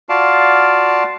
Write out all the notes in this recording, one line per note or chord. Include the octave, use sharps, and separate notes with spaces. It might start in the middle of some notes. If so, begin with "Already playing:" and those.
F4 F#4 D5 F5 A5